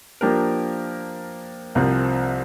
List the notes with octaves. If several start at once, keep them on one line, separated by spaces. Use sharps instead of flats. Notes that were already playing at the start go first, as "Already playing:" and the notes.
F3 A#3 D4 G4 A#4
C2 C3 F3 C4 A#4